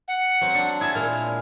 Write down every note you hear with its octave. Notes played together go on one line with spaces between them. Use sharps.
F#5
F#3 C4
D4
E4 G#4 A5 G#6
A#2 G#3 F6